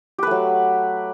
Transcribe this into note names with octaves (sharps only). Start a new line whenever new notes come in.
F#3 A3 G4 B4